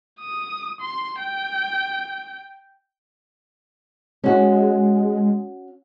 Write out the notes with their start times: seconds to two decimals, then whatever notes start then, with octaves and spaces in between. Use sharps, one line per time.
0.20 D#6
0.81 C6
1.19 G5
4.24 G#3 C#4 F#4